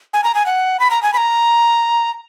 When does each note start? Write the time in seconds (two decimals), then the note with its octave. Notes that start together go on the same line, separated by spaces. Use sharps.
0.13 G#5
0.24 A#5
0.35 G#5
0.46 F#5
0.80 B5
0.90 A#5
1.03 G#5
1.13 B5
1.17 A#5